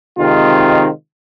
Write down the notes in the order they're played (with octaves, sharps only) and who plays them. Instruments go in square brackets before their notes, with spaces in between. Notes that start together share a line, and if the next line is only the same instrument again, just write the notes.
[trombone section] C3 D#3 G#3 C4 D#4 F4